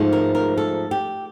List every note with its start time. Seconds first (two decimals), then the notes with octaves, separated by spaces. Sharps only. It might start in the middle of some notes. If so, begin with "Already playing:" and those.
Already playing: G#2 F3 A3
0.13 A#4
0.35 A#4
0.57 A4
0.91 G4